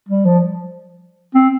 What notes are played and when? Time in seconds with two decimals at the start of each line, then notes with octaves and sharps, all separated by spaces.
0.08 G3
0.25 F3
1.34 C4